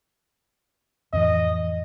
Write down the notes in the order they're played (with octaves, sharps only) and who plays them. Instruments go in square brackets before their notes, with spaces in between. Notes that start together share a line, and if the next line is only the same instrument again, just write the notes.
[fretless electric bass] F2 A2 E3 [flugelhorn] D#5